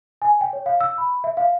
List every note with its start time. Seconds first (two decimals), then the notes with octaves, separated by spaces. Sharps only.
0.22 G#5
0.41 G5
0.53 C#5
0.66 F5
0.81 E6
0.98 B5
1.24 E5
1.37 F5